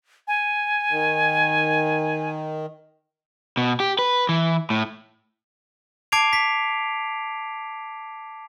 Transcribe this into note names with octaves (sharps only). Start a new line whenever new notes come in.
G#5
D#3
B2
G4
B4
E3
A2
A5 D6 G#6 C7 D7 F7
B6